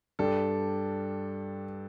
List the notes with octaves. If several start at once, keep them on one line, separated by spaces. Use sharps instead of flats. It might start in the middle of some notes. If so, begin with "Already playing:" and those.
G2 G3 D4 A4